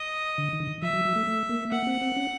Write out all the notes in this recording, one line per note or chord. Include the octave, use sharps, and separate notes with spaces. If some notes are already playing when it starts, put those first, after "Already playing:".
Already playing: D#5
D3
D#3
D3
D#3
F3 E5
F#3
F#3
A3
A3
A#3
A#3 F#5
C4
C4
C#4